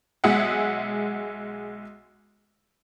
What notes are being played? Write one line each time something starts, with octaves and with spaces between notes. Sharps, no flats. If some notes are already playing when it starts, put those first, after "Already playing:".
B1 G#3 G#4 E5 F#5